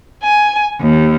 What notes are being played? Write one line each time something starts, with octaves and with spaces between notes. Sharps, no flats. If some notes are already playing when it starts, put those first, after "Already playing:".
G#5
D#2